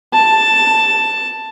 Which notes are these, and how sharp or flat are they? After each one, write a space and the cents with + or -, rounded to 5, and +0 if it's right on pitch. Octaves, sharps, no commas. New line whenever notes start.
A5 +5